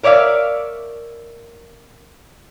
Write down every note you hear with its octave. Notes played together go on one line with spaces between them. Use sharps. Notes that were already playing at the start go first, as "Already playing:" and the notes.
A#4 C#5 D5 E5 F5